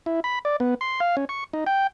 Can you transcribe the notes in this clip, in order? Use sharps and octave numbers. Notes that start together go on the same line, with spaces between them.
E4
B5
D5
B3
C6
F5
C#4
C#6
D#4
G5